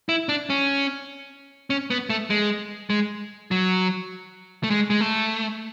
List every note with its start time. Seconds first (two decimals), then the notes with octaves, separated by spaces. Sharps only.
0.09 E4
0.29 D4
0.50 C#4
1.70 C#4
1.91 B3
2.10 A3
2.30 G#3
2.90 G#3
3.51 F#3
4.64 A3
4.70 G#3
4.90 G#3
5.01 A3